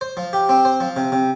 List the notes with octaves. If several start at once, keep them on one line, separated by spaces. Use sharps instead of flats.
C5
F3
G4
C4
C5
F3
C3
C3